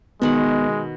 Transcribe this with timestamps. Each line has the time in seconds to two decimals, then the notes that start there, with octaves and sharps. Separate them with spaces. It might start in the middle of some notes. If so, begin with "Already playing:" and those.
0.22 B2 D#3 G#3 B3 F#5